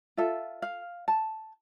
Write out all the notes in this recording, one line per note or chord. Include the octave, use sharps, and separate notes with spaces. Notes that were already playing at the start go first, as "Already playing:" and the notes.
F4 A4 E5
F5
A5